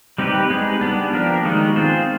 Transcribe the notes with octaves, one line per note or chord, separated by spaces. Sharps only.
G3 C4 D#4 G4 B4
G#3 B3 D#4 G#4 B4
G3 B3 D4
F3 A#3 D4 G4 A#4
D#3 G#3 B3 D#4 F#4
C4 F4 G#4 C5